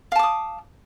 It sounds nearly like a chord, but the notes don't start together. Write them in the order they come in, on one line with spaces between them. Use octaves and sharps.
F5 A5 D6 D#6